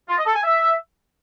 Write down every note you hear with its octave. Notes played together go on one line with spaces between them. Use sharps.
F4
D#5
A4
G#5
E5